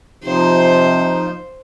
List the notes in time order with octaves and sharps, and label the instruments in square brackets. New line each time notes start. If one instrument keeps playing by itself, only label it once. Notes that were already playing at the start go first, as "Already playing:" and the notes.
[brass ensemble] C3 [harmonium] F3 D#4 F4 [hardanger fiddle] C5